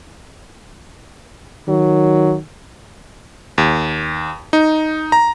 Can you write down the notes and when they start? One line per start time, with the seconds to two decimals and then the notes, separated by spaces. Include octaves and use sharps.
1.68 D#3 F#3
3.58 D#2
4.53 D#4
5.12 A#5